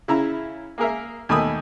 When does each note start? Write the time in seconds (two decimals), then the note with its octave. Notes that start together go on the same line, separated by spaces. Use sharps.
0.08 C#3 E4 A#5
0.78 A#3 G#4 A#4 E5
1.29 D#2 B2 A3 G#5 B5 D#6